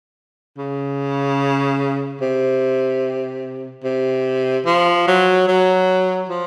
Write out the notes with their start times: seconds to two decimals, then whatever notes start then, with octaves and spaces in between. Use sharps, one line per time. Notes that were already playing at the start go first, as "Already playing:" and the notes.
0.57 C#3
2.21 C3
3.84 C3
4.66 F3
5.07 F#3
5.48 F#3
6.29 F3